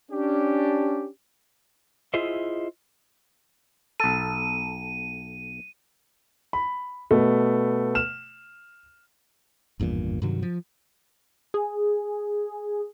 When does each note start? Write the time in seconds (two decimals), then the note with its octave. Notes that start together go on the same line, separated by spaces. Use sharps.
0.11 C#4 D4 G4
2.14 E4 F4 G#4 C5 D#5 E5
4.00 B1 A4 D#7
6.53 B5
7.11 B2 A3 B3
7.95 F6 E7
9.80 G#1 E2 G2 A#2
10.22 G2 C3 D#3 F#3
10.42 F3
11.54 G#4